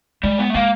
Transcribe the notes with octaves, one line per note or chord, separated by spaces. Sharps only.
G3 G#3
B3
A3
G#3 A#3